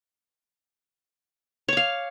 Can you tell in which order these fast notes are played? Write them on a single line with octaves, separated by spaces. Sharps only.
C#5 D6 F5